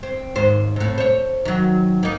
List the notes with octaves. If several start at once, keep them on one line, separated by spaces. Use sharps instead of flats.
C4
D#2 G#2 C5
A2 C3
C5 C#5
D#3 F#3
A#3 D#4